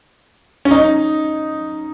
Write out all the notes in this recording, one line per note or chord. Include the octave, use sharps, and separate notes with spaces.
C#4
D#4